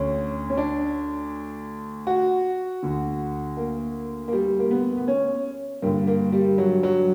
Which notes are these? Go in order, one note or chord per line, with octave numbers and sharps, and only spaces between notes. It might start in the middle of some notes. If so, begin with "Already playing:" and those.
Already playing: D2 D3 C#4
C#4
D4
F#4
D2 D3
A#3
A#3
G3
A#3
B3
B3
C#4
G2 D3 A#3
A#3
G3
F#3
F#3